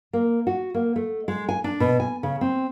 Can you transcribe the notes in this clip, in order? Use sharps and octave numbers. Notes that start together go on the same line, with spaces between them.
A#3
F#4
A#3
A3
G#3
G#5
D4
B2
G#5
C#3
C4